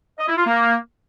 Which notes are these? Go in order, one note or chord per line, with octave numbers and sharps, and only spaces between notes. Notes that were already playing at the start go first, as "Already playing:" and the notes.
D#5
E4
F4
A#3